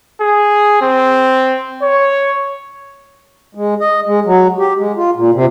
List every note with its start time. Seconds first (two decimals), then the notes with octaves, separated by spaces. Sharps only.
0.21 G#4
0.82 C4
1.83 C#5
3.55 G#3
3.80 D#5
4.06 G#3
4.25 F#3
4.59 G4
4.78 G#3
4.96 F4
5.16 A#2
5.35 C3